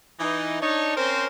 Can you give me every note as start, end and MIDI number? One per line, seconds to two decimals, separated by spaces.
0.19 0.57 52
0.19 0.57 63
0.61 0.94 62
0.61 0.94 63
0.61 0.94 73
0.96 1.27 60
0.96 1.27 61
0.96 1.27 70
0.96 1.27 72